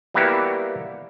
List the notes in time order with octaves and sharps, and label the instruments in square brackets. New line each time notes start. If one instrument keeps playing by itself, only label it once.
[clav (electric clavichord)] G3 A#3 B3 E4 F#4 G4